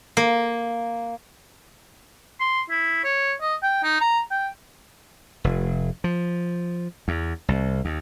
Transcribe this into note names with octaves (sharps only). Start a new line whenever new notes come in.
A#3
C6
E4
C#5
D#5
G5
D#4
A#5
G5
F1
F3
E2
C2
D#2